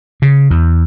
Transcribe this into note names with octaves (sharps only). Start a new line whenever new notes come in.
C#3
E2